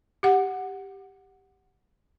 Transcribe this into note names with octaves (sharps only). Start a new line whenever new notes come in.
G4 F#5